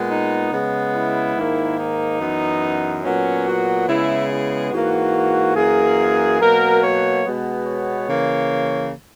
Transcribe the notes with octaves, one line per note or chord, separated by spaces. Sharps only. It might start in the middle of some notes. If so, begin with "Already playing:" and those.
Already playing: A#2 G#3 B3
D#4
C#3 G#3 B3
E4
G#2 D#3 A#3
D#4
F#2 E3 B3
A#2 F#3 B3 C#4
F#4
C#3 G#3 B3 E4
E4
G#2 E3 A#3 F#4
F#2 E3 A#3 G#4
B2 F#3 A#3 A#4
C#5
B2 G#3 B3
C#5
C#3 E3 A#3